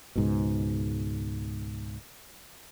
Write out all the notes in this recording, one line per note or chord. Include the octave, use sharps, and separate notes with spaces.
C#2 G#2 B2